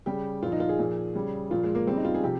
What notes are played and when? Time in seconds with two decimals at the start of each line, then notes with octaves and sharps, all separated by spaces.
0.06 C#3 G3 G4
0.43 A#2 F3 F4
0.52 D#4
0.60 F4
0.69 G#4
0.79 A#2 F3
1.15 C#3 G3
1.51 A#2 F3 F4
1.64 G#3
1.75 A#3
1.87 C#3 G3 C4
1.97 D#4
2.05 F4
2.14 G#4
2.23 C3 F3 G4